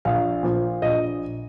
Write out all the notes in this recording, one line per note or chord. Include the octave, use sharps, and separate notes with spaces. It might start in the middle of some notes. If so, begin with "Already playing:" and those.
A#1 F5
A#2 F3
A#1 D#5